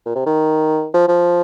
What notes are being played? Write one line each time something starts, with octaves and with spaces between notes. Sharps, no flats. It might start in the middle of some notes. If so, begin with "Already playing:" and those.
A#2
C3
D#3
F3
F3